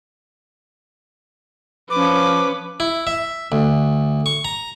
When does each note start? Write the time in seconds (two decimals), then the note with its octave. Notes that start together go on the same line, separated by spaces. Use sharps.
1.90 F3 C#4 B4 D6
2.80 E4
3.07 E5
3.52 D2
4.26 C#6
4.45 A#5